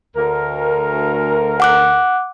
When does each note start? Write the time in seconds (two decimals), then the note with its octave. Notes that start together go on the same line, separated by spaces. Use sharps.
0.16 D2 A#4
1.60 F#5 D6 F#6